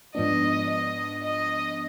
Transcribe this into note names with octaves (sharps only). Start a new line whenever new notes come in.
G#2 F3 B3 D4 D#5
D#5
D#5